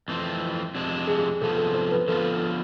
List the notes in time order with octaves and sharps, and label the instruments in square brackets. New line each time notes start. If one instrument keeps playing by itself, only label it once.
[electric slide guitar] F2 E3 A3 C4
F2 C3 G#3 D4
[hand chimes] G#4
[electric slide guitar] C3 F3 B3 [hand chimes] A4
[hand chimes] A4
C5
B4
[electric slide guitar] D3 F3 B3 F4 [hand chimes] A4